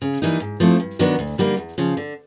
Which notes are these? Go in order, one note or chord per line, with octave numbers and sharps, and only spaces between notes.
C#3
E3 G3 A#3 D#4
G#2
F3 A3 C4 E4
G2
D#3 F#3 B3 D4
D2
D3 G3 A#3 D#4
E2
C#3 F3
D3